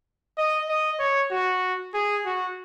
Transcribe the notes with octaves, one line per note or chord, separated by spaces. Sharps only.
D#5
D#5
C#5
F#4
G#4
F#4